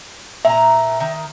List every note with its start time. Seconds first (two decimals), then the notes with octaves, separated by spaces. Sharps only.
0.45 A#2 E5 A#5
1.00 D#3